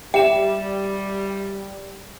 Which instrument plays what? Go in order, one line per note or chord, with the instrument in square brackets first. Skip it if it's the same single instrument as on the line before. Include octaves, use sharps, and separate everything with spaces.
[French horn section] G3 [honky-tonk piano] G4 [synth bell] E5 E7 [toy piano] G5